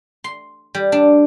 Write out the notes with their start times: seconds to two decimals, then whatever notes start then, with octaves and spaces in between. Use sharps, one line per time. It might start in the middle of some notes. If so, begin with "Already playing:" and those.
0.24 C6
0.75 G3
0.92 D4